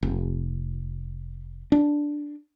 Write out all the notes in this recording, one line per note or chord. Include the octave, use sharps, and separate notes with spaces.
F1
D4